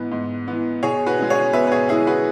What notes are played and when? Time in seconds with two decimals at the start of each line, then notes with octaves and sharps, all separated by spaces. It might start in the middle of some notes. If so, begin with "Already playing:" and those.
Already playing: G#2 E3 B3
0.12 G#2
0.48 E3 B3
0.83 B2 G#4 C#5
1.06 F#4 B4
1.19 G#3 C#4
1.30 G#4 C#5
1.53 B2 B4 E5
1.67 B4
1.71 G#4 C#5
1.89 G#3 C#4 E4 G#4
2.07 F#4 B4